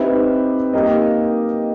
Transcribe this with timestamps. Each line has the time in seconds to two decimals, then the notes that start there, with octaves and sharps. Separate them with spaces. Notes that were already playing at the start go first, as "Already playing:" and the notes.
Already playing: C4 D#4 G4 B4 E5
0.73 A#3 D#4 G4 A#4 D#5